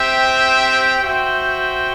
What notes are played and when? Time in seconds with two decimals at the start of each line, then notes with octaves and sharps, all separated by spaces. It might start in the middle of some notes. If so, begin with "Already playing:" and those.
Already playing: C4 G4 C5 E5 G5
1.02 F#4 C5 E5 G5